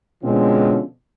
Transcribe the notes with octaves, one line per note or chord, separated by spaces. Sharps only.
B2 D3 F3 G#3 C4 C#4